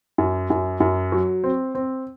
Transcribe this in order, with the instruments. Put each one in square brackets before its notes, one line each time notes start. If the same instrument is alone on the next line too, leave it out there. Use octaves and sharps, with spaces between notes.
[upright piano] F#2
F#2
F#2
F#3
C4
C4